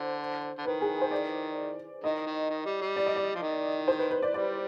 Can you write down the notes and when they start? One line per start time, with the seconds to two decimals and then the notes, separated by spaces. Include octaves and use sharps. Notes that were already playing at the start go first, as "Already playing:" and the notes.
Already playing: D3 C5
0.58 D3
0.65 D#3 B4
0.81 G#4
1.02 C5
1.11 D5
2.04 D#3 D#5
2.26 D#3
2.50 D#3
2.66 G3
2.81 G3
2.96 D5
3.06 D#5
3.16 D5
3.35 F3
3.42 D#3
3.88 C5
3.99 B4
4.11 B4
4.23 D5
4.33 G3 D5